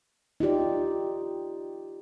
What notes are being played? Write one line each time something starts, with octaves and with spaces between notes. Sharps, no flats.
D#4 F4 G4 D5